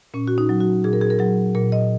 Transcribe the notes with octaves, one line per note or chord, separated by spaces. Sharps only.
A#2 C#4
F#4
D#4
F#3
F#4
A#2 G#4
A#4
G#4
A#4
F#3 G#4
A#2 A#4
D#5